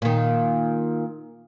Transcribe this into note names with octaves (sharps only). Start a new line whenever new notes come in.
A#2 D#3